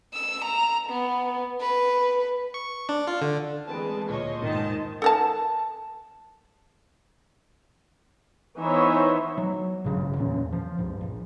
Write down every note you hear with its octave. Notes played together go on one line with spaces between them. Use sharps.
E6
A#5
B3
B4
C#6
D4
F4
D3
E3 G#3 C4 B4 A5 D7
D2 A#2 C5 C#5 D#5
E1 G#2 D#3 A5
A4 A#4 A5
E3 B3 D#4 C5 C#5 E5
F#3
G#1 G2 C#3 F#3
E2 A#2 C#4
F3
C#2 G2
A#1